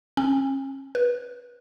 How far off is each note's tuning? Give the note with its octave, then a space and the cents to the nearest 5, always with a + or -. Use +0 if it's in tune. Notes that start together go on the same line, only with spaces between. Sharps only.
C#4 -40
B4 -25